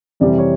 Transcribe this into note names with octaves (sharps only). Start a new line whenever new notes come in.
F2 C3 E3 G3 D5
C#5